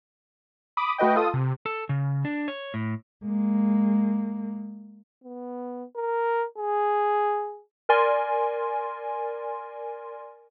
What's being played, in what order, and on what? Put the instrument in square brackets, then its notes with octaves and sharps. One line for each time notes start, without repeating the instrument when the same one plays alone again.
[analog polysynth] B5 D6 D#6
A3 F#4 B4 D#5 G5
F4 A4 D#6
C3
[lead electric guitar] A4
C#3
D4
C#5
A2
[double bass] G#3 A#3
[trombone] B3
A#4
G#4
[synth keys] A#4 D5 G#5 C6